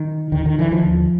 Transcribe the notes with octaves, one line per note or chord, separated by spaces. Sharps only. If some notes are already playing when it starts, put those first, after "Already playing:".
Already playing: D#3
D#2 D3 D#3
D#3
D3 E3
D#3 F3
D#2 D3